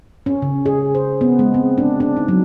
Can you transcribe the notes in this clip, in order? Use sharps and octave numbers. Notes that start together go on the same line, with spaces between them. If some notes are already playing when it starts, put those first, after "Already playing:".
C#4
C#3
G#4
C5
B3
G#3
C4
D4
D4
D#4
F#3